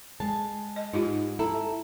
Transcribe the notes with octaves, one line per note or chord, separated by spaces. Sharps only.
G#3 A5
D#5
G#2 D#4 F4 G4
E4 A4 A#5